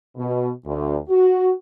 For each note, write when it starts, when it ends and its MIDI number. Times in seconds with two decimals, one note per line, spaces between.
0.17 0.50 47
0.66 0.97 38
1.10 1.52 66